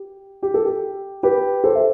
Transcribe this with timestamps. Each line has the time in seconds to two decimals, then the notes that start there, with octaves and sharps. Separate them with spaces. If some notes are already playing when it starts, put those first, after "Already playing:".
Already playing: G4
0.43 G4
0.54 A4
0.65 G4
1.23 G4 B4
1.64 A4 C5
1.75 E5